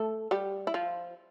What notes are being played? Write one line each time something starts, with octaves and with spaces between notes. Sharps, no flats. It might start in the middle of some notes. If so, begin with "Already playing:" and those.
Already playing: A3 A4
G3 G4
E4
F3 F4